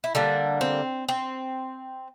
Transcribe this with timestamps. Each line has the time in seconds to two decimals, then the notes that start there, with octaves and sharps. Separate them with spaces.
0.04 E4
0.15 D3 G3 A#3 D4
0.61 C4
1.09 C4